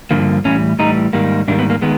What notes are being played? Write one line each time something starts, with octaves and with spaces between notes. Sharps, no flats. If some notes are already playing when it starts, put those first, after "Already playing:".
G2 D3 F3 A#3
A2 E3 G3 C#4
A2 E3 G3 D#4
G#2 D#3 G3 A#3
G#2 D#3 G3 A#3 D4
B3
A#3
D#3 G#3 B3